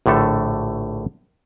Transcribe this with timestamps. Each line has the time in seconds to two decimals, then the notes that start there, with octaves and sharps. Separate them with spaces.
0.06 A#1 A2 D3 A3 A4